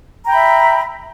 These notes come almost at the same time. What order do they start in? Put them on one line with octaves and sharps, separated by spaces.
A#5 G5 B5 E5